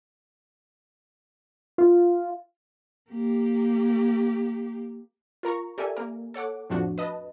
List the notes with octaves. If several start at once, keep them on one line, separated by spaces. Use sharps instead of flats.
F4
A#3 G4
F4 A#4 A#5 C#6
G4 A4 A#4 D5 E5 G#5
A#3 A#4
A4 C#5 F#5 D6
F2 A2 F3 D4 F#4
B4 D#5 A5